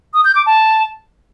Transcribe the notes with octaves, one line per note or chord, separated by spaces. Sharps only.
D#6
G6
D6
A5